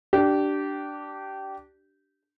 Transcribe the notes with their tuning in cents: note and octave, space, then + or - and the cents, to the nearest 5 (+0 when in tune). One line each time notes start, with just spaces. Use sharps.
D4 +0 G4 -20